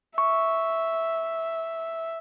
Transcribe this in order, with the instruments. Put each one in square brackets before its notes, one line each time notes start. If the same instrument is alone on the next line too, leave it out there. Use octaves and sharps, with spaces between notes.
[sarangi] E5 [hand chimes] C#6